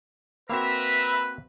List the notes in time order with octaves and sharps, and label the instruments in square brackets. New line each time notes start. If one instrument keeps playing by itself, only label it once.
[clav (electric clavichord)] A#3 C4 F#4 [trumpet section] A#4 E5 [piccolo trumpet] B4 [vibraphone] B5